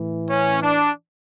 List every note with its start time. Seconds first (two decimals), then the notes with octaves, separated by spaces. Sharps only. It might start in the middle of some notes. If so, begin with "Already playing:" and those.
Already playing: A2 E3
0.28 C#4
0.61 D4